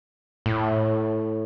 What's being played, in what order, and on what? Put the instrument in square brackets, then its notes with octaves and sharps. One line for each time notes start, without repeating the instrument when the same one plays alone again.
[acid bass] A2